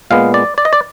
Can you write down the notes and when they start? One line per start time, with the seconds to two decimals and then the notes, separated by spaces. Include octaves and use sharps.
0.10 A#2 G#3 B3 F5
0.34 D5
0.58 D5
0.65 D#5
0.73 D5